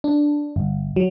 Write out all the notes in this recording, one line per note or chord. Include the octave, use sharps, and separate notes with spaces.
D4
G1
F#3